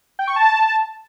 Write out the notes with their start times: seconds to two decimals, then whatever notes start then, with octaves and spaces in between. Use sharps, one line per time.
0.19 G5
0.27 C#6
0.36 A5